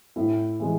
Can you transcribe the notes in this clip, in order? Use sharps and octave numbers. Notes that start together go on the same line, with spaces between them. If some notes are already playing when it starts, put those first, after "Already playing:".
A2 E4
E3 G#3